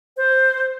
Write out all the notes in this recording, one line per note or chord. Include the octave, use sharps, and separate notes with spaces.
C5